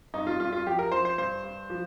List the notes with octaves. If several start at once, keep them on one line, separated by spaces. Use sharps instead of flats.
G2 D#4
F4
G2 F4
F4
F3 G4
A#4
F3 C5
C5
G2 C5
G2
F3